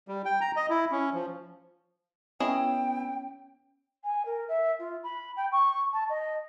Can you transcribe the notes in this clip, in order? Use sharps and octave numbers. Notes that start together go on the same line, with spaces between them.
G3
G5
A#5
D#5
E4
C#4
F3
B3 C#4 E4 G#4 D#5 G5
G#5
A#4
E5
F4
B5
G5
C#6
A5
D#5